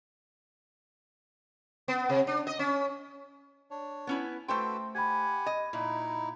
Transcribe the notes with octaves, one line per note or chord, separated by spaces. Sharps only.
B3
C3
D4
D#5
C#4
D4 C#5
B3 C#4 E4
A3 F#4 A4 B4 C5 G5 C6
G4 F#5 G#5 B5 G#6
D#5
A#2 D#4 E4